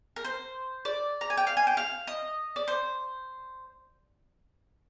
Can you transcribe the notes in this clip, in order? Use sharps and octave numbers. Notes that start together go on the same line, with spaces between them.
A#4
C5
D5
A#5
G#5
G5
F5
G#5
G5
F5
D#5
D5
C5